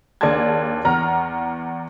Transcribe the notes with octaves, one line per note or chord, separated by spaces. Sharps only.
D#2 D4 G#4 D5 A5 G#6
E2 A#5 F6